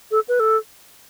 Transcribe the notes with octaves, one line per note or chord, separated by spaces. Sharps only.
A4
B4
A4